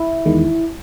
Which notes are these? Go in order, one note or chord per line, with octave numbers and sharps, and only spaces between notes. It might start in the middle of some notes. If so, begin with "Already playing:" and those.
Already playing: E4
E2 D#3 G#3